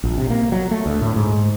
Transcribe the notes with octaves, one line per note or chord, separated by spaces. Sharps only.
A#1
C3
A#3
F#3
A3
D2
A2
G#2